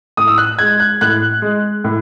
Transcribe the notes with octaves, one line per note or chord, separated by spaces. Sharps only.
A2 D#6
E6
F#6
G#3 G#6
F#6
A2 F#6
G#3
A2